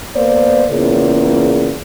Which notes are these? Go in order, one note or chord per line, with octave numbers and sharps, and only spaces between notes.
A#3 B3 C5 D5
E2 A#2 C#3